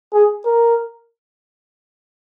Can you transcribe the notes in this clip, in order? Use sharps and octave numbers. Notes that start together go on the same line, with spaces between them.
G#4
A#4